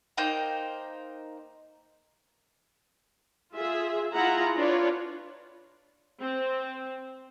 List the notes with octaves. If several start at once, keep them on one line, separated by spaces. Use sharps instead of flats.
A#3 D#4 C5 G5
F4 G#4 E5
E4 F4 G#4 F#5 A#5
D4 F4 B4 C#5 D5
C4